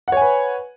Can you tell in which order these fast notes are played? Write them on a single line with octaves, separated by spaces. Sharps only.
F#5 C#5 G#5 B4